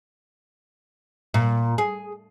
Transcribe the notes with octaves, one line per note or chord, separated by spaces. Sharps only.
A#2
G#4